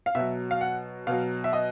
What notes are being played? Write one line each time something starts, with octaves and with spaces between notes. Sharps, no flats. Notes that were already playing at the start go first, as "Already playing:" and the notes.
F5
B2 F#3 E5
F5
F#5
B2 F#3 F5
E5
D#5